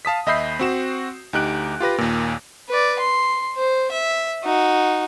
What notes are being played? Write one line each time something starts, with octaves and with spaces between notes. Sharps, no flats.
F5 A5 D#6 B6
D#2 D#5 E5 B5 G6 C7
C4 F#4 E7
D2 D#4 G4 F#6 D7
F4 G4 B4 A#6
D#2 A#2
B4 D5
C6
C5
E5
D#4 F#4